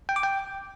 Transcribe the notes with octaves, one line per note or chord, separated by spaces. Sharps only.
G5
D6
G5